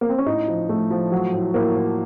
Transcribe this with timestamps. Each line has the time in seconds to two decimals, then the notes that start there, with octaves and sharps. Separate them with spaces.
0.01 A#3
0.09 C4
0.18 C#4
0.26 A2 D#4
0.48 F3
0.69 A2 A3
0.90 F3
1.12 F#3
1.33 A2
1.54 A2 A#3
1.76 A2